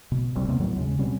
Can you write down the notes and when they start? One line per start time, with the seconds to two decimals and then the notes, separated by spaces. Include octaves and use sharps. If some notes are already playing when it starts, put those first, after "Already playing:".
0.12 B2
0.35 F1 C2 G3 C4
0.48 D#2 C3 A#3 B3
0.60 A2 D#3 F#3 B3
0.76 D#2 C#3 G#3
0.99 B2 G3 C4 C#4